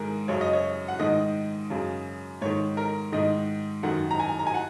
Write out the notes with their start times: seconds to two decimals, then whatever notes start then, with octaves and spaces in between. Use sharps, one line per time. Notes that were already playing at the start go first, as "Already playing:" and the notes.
Already playing: G#2 D#3 G#4 A#4
0.28 F#2 C#3 C#5
0.41 D#5
0.53 C#5
0.88 F#5
0.99 G#2 D#3 D#5
1.70 F#2 C#3
2.42 G#2 D#3 C#5
2.77 A#4
3.12 G#2 D#3 D#5
3.83 F#2 D#3 F#5
4.11 A#5
4.20 G#5
4.39 A#5
4.47 G#5
4.54 F#5